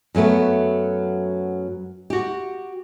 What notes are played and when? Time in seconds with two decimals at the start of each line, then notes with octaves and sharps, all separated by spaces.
0.15 F#2 F#3 A3 B3
2.10 F#4 G4